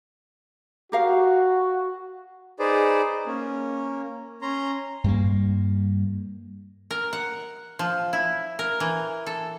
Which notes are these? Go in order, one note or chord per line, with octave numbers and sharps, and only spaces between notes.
F#4 G4 A#4 F5
D#4 G#4 B4 C5 D5
A#3 C#4
C#4 A#5 C6
G2 G3 A#3
A#4
F#5
F3
E4
A#4
E3
A4